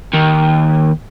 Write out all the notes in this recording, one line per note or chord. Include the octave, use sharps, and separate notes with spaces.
D#2